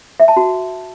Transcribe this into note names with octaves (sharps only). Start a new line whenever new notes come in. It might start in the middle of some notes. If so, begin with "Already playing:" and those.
E5
A5
F#4